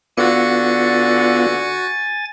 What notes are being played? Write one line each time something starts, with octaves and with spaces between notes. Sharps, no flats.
D3 B3 F4 F#4 G#5 A6 C#7